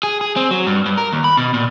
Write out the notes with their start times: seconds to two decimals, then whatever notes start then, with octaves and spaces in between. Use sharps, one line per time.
0.03 G#4
0.21 G#4
0.36 C4
0.51 F#3
0.67 G2
0.86 G2
0.98 A#4
1.12 D#2
1.24 B5
1.37 B2
1.54 A#2